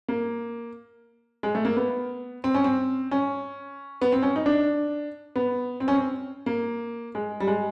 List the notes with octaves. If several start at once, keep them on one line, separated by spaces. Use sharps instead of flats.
A#3
G#3
A3
A#3
B3
C4
C#4
C4
C#4
B3
C4
C#4
D#4
D4
B3
C4
C#4
C4
A#3
G#3
G3
G#3